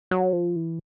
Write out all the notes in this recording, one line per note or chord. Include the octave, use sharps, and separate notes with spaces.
F#3
F3
E3